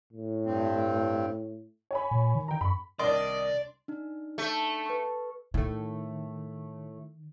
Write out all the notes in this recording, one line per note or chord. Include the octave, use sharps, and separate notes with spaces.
A2
G2 C4
C#5 G#5 B5
A#2
D#3
G5 A#5
F#2 B5 C#6
C2 D#3 D4 D5 D#5 C6
D4 D#4
A3
B4 C#6
A2 D#3 A3